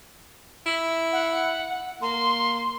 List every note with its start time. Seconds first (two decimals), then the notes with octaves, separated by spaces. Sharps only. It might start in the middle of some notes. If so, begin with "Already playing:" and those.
0.66 E4
1.13 F#5
2.02 A#3 C6